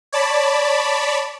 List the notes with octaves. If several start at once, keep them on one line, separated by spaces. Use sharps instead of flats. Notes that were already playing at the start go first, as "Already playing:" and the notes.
C#5 D5 A5 B5